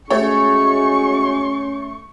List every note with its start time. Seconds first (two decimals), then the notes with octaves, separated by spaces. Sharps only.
0.10 G#3 A3 C#4 F#4 G#4 C#5 C#6